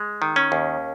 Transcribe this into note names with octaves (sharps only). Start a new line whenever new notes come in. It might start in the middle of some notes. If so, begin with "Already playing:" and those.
Already playing: G#3
D#3
C#4
D#2